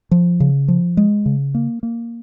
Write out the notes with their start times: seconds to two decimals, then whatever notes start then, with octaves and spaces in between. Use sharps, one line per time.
0.11 F3
0.40 C#3
0.68 F3
0.97 G#3
1.26 C#3
1.55 A#3
1.83 A#3